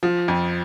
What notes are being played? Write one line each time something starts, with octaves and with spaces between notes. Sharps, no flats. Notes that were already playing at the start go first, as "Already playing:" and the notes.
F3
F2